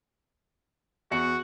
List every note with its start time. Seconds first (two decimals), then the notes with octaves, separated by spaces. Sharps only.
1.11 E2 F#4 C#7